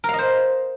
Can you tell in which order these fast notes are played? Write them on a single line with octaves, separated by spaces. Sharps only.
A#4 F5 D#5 C5